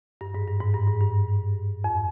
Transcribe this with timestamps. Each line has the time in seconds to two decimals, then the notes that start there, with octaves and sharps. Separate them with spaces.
0.21 G2
0.35 G#2
0.48 G2
0.61 G#2
0.74 G2
0.88 G#2
1.01 G2
1.84 F2